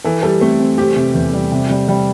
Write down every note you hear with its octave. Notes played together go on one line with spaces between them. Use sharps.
E3 A4
G3 A4
A3 C4
C4
C4 G4
C3
E2
G3
C3
G3
G3